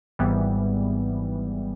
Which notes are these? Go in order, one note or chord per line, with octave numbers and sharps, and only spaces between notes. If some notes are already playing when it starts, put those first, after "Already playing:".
G#1 G#2 E3 G3 B3